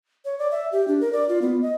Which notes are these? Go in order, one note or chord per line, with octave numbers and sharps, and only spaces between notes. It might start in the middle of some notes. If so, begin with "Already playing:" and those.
C#5
D5
E5
G4
D4
A#4
D5
F4
B3
D#5